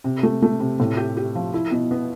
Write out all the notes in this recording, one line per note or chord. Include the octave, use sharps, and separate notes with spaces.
C3
A3
A3
C3
A2
G4
G4
F3
E4
B2
B3